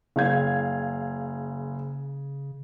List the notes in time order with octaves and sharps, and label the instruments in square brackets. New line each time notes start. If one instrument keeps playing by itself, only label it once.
[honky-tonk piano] F#1 F5 G#6 [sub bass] C#3